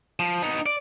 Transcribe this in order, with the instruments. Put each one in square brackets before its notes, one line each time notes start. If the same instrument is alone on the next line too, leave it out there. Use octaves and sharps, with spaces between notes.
[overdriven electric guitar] F3
B3 D#4
D5